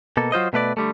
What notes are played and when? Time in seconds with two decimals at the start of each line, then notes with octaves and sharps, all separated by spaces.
0.17 B2 A#3 A4
0.32 F#3 F4 C5 D#5
0.53 B2 A3 B4 D5
0.77 D3 G3 A3